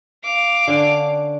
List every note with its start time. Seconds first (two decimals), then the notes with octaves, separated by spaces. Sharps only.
0.24 F5 D6
0.67 D3 C#4 D4